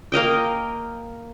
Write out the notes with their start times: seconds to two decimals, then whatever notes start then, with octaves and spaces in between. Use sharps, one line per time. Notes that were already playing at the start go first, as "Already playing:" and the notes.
0.12 A#3 A#4 D#5 G5